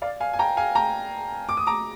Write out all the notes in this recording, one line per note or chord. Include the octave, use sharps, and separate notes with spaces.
D5 F5
F5 G#5
G#5
G5 A#5
F5 G#5
G5 A#5
D6
D#6
A#5 D6